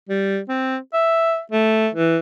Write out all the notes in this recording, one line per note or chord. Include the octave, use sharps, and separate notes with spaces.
G3
C4
E5
A3
E3